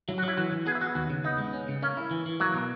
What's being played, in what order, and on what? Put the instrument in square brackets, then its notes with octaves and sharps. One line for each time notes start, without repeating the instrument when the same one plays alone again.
[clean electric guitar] F#3 [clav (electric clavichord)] E4
[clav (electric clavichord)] F#4
[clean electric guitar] F#3
[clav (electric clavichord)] E4
[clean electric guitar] E3 [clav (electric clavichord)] F#4
[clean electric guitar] E3
[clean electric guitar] B3 [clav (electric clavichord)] G#4
[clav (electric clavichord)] E4
[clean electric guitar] B3 [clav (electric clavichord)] F#4
[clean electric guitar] D#2 [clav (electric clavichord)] F#4
[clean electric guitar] C#3
[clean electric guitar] B3 [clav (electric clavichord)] D#4
[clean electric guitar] G#3
C#4
C#3
[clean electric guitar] A#3 [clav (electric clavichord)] C#4
[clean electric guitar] E4
E3
E3
[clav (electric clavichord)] F#3 [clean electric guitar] A#3
[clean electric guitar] B2